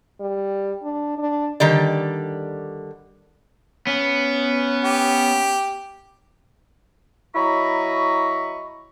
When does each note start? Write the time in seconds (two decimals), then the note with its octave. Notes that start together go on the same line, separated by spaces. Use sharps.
0.20 G3
0.83 D4
1.18 D4
1.60 D3 D#3 G3 D5
3.87 B3 C#4
4.84 G4
7.35 F#3 E4 D#5 A#5 B5 C#6